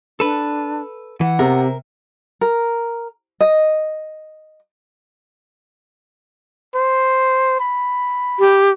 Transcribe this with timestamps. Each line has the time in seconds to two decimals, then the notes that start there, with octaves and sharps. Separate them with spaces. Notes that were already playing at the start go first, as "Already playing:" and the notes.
0.20 D4 A4 B4
1.21 E3 F#5
1.39 C3 A#4
2.41 A#4
3.41 D#5
6.74 C5
7.60 B5
8.39 G4